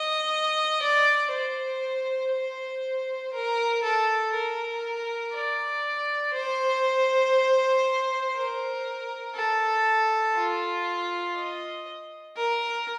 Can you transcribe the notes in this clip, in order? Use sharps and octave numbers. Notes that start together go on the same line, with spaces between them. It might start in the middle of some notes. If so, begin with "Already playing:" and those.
Already playing: D#5
D5
C5
C5
A#4
A4
A#4
D5
C5
A#4
A4
F4
D#5
A#4